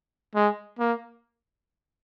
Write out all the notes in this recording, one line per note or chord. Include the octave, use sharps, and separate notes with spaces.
G#3
A#3